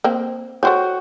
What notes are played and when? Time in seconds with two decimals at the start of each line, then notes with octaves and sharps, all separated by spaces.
0.04 A#3 C4
0.63 F#4 A4 C5 C#5 G5